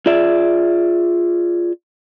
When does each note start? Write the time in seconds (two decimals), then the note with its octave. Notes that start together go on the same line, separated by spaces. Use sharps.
0.06 F4 G#4 D5 E5